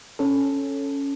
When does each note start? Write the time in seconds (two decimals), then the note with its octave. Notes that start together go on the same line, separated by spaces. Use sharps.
0.19 C#4 A4